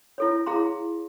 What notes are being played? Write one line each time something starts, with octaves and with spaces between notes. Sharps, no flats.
E4 A4 C#5
E4 G#4 F5 A#5 C6